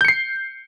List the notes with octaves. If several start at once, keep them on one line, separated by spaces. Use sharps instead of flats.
G6 C7 C#7